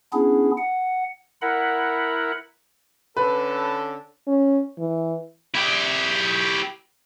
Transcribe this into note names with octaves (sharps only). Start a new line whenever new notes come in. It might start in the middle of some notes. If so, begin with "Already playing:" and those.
B3 C#4 D4 E4 G#4
F#5
E4 A#4 F#5 B5
D3 C#4 A4 B4
C#4
E3
E4 G4